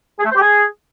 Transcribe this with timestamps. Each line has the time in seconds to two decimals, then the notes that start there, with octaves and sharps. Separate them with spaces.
0.19 G#4
0.25 A3
0.30 C5
0.36 G4
0.41 G#4